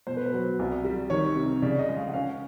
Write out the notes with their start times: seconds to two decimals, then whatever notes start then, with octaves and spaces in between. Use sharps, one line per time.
0.07 B2 C5
0.17 B4
0.26 C5
0.33 F#3
0.59 C2
0.85 G3
1.10 D#3 C#5
1.36 C3
1.62 C#3 D5
1.79 D#5
1.89 G#3
1.96 F5
2.08 F#5
2.14 C#4 F5